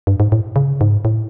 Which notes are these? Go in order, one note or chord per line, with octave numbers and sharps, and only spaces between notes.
G2
G#2
A2
C#3
G#2
A2